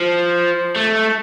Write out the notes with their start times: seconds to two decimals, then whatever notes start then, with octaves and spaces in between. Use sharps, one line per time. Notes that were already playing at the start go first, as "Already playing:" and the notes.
Already playing: F3
0.76 A3